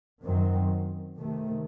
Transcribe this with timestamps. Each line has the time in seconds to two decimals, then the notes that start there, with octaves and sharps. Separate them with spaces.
0.22 F#2 D#3 F#3 C4
1.18 C3 D#3 A3